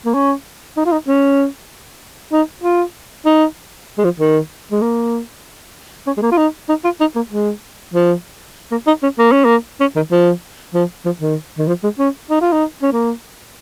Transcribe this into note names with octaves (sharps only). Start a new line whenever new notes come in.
A#3
C#4
D#4
F4
D#4
C#4
D#4
F4
D#4
G#3
F3
D#3
G#3
A#3
C#4
G#3
A#3
F4
D#4
D#4
F4
D#4
A#3
G#3
F3
A#3
D#4
C#4
A#3
C#4
A#3
C#4
D#3
F3
F3
F3
D#3
D#3
F3
G#3
C#4
D#4
F4
D#4
C#4
A#3